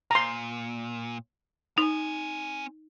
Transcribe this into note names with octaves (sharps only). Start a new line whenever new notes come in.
A#2 A#5 C6
C4 D#4 G#5